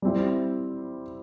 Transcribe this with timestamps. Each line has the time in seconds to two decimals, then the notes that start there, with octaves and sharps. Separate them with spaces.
0.02 G3 C4 E4